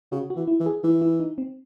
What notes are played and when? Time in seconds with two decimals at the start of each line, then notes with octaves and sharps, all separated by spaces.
0.12 C#3 F#4
0.30 F#4
0.36 E3
0.47 E4
0.60 E3
0.66 G#4
0.83 E3 E4
1.02 E4
1.20 D#4
1.38 C4